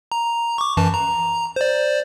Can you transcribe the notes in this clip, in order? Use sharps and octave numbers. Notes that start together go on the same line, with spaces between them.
A#5
C#6 D6
F#2 E3 A5
A#5
C5 D5